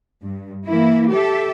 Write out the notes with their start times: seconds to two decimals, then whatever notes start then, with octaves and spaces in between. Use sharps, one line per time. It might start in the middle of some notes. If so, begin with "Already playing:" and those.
0.23 G2
0.67 E3 A#3 E4
1.10 G4 A4 E5